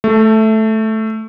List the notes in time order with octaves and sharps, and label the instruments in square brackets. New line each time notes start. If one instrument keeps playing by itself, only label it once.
[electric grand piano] A3